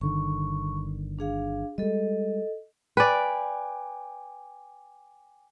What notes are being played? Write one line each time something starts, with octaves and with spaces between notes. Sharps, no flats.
G1 D3 D#3 C#6
D4 G#4 F5
G3 G#3 A4 D#5
B4 D5 G5 G#5 D6